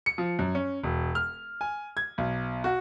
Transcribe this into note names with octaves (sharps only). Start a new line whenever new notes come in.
C#7
F3
F#2
C#4
E1
F6
G#5
G#6
B1
F#4